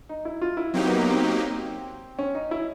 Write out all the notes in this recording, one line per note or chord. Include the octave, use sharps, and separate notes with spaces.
D#4
E4
F4
E4
F#3 A#3 C4 D#4 G4
B3
B3
C4
C#4
D#4
E4